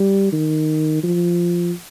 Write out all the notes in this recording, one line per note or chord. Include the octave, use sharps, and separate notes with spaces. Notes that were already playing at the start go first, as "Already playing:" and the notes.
Already playing: G3
D#3
F3